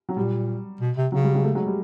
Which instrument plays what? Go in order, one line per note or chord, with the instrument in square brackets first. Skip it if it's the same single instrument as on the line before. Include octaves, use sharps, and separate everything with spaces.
[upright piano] F#3
[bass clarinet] A#2 [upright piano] G3
[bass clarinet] B2
C3
[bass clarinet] C#3 [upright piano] F#3
[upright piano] G3
F#3 G#3
G3 A3
F#3 G#3
G3